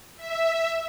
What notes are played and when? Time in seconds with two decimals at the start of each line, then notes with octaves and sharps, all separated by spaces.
0.17 E5